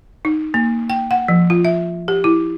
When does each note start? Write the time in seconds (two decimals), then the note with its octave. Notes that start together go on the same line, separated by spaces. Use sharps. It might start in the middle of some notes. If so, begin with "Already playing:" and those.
0.25 D#4
0.54 A#3
0.90 G5
1.11 F#5
1.28 F3
1.50 F4
1.65 E5
2.08 G4
2.24 E4